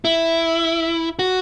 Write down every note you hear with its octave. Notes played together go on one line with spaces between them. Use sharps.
E4
F#4